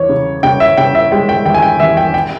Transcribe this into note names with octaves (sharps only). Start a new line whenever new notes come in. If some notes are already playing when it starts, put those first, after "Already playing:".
Already playing: E2 C#5
C#3
C#3 G5
E5
C#3 G5
E5
G#3 G5
G5
E2 G5
G#5
G5
E2 E5
G5
G5